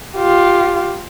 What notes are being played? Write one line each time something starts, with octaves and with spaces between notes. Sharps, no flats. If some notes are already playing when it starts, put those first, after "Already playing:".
F4 G4